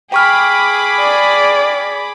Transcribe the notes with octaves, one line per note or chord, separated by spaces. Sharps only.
G#4 G5 B5 C#6 D6 F6
D5